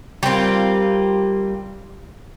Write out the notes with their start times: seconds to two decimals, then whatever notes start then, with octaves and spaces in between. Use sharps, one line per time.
0.23 G3 A#3 C4 F4